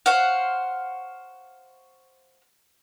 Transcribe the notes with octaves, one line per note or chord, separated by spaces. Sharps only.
C5 C#5 F5 F#5